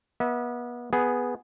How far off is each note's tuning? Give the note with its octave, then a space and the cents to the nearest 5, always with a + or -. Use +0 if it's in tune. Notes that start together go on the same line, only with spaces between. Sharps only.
B3 -30 E5 -40
B3 +0 G#4 +0